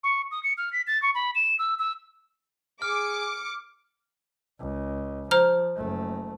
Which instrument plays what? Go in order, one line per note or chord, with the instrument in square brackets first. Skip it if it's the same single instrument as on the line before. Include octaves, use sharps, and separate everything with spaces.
[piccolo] C#6
D#6
C#7
F6
B6
A6
C#6
B5
E7
E6
E6
[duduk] G#4 [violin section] D6 C#7 [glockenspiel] F6
[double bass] C#2
[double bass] F3 [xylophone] C5 A#5 F6
[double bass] F#1 A3